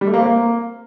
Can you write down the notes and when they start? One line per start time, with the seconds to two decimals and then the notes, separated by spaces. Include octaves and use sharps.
0.01 G3
0.07 A3
0.14 A#3
0.20 C4
0.26 A#3